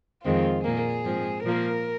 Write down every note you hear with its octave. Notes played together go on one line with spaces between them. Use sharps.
F2 D#3 G#3 C4 F4
A#2 A#3 G#4
G#2 F3 C4
A#2 F3 A#3 A#4